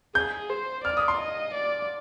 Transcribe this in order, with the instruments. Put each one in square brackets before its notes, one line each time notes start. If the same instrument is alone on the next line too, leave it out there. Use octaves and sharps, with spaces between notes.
[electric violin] G#4 [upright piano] G6
[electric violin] C5
[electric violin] D5 [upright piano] F6
[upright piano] D#6
C6
[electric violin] D#5
D5